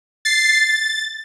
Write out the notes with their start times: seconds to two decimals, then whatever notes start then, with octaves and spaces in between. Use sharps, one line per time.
0.25 A6 C7
0.58 A6